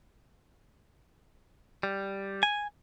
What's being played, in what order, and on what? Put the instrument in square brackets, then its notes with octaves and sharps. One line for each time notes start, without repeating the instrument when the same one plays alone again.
[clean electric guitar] G3
G#5